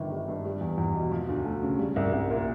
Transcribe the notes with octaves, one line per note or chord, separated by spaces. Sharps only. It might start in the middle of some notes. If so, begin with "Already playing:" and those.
Already playing: G1 D#3
G3
G2
G3
E2
E2
B2
F3
D2
A3
C#3
G3
C2
C2
A#2